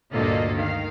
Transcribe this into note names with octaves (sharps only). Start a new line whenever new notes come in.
D2 G2 A#2 A#3 A4 D#5
D#3 F5